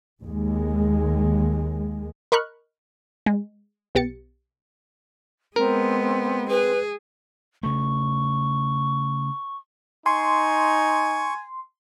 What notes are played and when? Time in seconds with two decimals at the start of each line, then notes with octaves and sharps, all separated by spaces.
0.23 D#2 G#3
2.32 A#4 D#5 B5 C#6 F6 F#6
3.26 G#3
3.95 B1 B3 G4 A6 C#7
5.56 G#3 B3 C4 A#4
6.50 G#4 B4
7.63 C#3 A3 C#6
10.06 D#4 G#5 C6 C#6